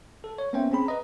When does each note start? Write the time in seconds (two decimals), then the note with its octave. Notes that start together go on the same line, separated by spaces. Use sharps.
0.24 A4
0.38 C#5
0.53 A#3 B3 C#4 C5 E5 G5
0.71 C4 C#4 G#4 B5
0.86 B4 D#5 A#5